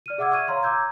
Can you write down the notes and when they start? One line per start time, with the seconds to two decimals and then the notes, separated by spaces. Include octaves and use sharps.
0.06 D5 F6 D#7
0.18 G#4 E5 F#5 D6 E6 G#6
0.32 C#6 F6 G#6 D#7
0.48 C#5 F5 A#5 C6 F6
0.63 A#5 D6 E6 G6 G#6